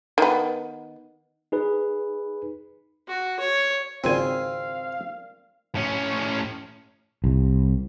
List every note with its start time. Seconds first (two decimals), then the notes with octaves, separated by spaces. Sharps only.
0.18 D#3 B3
1.52 D#4 G#4 B4
3.08 F#4
3.40 C#5
4.04 G#1 C#2 C4 A#4 D5 F5 G#5
5.75 A2 C#4
7.24 C2